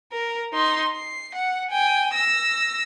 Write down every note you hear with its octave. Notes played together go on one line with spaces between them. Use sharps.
A#4
D#4 C6
C7
F#5
G5 G#5
E6 A#6